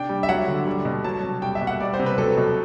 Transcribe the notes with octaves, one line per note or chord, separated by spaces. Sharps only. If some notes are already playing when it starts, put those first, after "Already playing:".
Already playing: C3 D4 G5
G3
E5
F#3 F#5
D3
G3
B2
F#3 A5
C3
G3 G5
E5
B2
F#5
G3 D5
C5
C3
B4
F#3 A4
B2